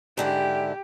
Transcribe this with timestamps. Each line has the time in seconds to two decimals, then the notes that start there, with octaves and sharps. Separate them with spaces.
0.17 G#2 D3 E4 G4